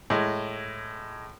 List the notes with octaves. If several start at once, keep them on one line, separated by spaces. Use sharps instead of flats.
A2 G#3